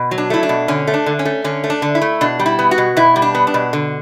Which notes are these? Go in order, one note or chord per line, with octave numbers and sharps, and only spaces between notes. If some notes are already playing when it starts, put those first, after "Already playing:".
Already playing: B2
F#3
D4
A3 E4
D4
B2
D3 C#4
A3
D4
D3
C#4
A3
D3 C#4
A3
D4
D3
E4
A3
B2 D4
G3
E4
B3
F#4
B2
B2 E4
G3
D4
B3
D4
B2
D3